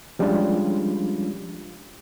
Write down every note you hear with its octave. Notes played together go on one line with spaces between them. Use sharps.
F3 G3 G#3 C#4 D4 F4